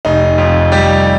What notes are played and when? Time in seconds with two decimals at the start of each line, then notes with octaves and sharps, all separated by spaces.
0.05 F1 D#4
0.38 F2
0.72 G3 G4